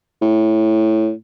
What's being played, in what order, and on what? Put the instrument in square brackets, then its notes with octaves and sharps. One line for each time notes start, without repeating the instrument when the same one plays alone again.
[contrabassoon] A2